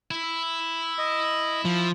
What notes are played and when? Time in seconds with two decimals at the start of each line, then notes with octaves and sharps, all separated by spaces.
0.11 E4
0.98 D#5
1.65 F3